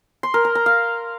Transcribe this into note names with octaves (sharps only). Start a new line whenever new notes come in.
C6
A#4
A#5
A#5
F5